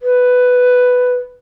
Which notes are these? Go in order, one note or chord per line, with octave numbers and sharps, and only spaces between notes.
B4